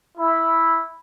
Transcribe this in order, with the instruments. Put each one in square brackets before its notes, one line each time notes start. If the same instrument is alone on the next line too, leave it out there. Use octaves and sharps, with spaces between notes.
[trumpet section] E4